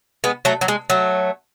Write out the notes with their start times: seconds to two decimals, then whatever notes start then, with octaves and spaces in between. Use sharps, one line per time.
0.24 G#3 B3
0.45 F#3 A3
0.61 F#3
0.68 G#3
0.90 F#3 A3